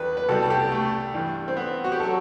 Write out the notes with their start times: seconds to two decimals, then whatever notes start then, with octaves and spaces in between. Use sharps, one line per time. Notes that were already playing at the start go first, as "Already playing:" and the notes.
Already playing: E2 D#3 G3 B4
0.17 B4
0.29 C2 B2 G3 A4
0.42 A4
0.50 G4
0.72 A3
1.14 G2 E3 G3
1.48 C4
1.57 B3
1.84 F#4
1.92 G4
2.00 F#3 A4